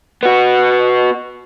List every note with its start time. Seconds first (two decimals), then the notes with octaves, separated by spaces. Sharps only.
0.23 B3 F#4